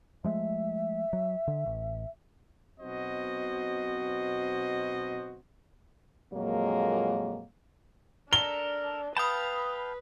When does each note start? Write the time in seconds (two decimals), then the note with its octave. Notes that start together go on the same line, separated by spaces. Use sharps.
0.24 F3 G#3 A3 E5
1.13 F#3
1.48 D3
1.66 A1
2.81 B1 B2 C4 F#4 C5 D#5
6.32 F2 A#2 F#3 G#3 A#3
8.33 D4 A4 A#4 G7
9.17 B4 F5 G5 A5 B5 D#6